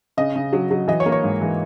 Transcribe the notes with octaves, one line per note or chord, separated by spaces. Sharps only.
C#3 D#5
C#3
F#3
F#3
E3 D#5
C#5
A#3
C#5
G#2
E3